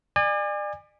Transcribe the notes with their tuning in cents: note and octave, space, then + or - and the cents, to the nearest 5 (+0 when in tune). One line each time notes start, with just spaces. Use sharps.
D5 +35 G#5 -30